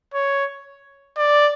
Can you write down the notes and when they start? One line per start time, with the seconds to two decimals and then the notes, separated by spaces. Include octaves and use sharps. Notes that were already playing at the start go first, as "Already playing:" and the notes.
0.14 C#5
1.17 D5